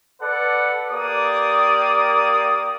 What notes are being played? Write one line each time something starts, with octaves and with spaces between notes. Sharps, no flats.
A4 B4 D5 F#5
A#3 G4 D5 D#6